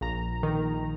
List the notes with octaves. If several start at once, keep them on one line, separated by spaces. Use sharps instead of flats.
A#1 A#5
D#3